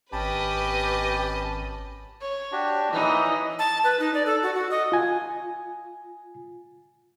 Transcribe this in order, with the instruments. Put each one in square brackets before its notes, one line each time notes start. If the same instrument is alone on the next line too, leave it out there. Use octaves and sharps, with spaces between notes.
[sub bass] G#1 [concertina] C#4 A5 B5 [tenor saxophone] G4 [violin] B4 D#5
[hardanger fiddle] C#5
[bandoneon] D4 F#4 G4
[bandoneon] A#2 [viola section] E3 D#5 [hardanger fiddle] D#4
[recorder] A5
B4
D#4
D5
A4
F#4
F#4
D#5
[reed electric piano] F4 G#5